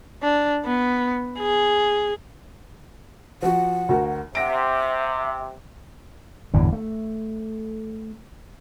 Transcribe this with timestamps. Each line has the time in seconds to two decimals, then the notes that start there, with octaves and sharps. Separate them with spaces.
0.23 D4
0.65 B3
1.39 G#4
3.42 F3 F#4 F#5
3.89 D2 F#4 A#4
4.35 C3 E5 F#5 A#6 D7
6.54 G1 E2 A2 D3
6.73 A3